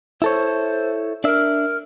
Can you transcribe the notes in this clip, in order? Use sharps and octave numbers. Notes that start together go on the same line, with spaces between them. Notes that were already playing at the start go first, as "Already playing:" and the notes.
E4 A4 C5 C#5
D4 A#4 E5